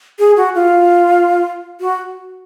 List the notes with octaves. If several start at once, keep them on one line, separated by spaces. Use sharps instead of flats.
G#4
F#4
F4
F#4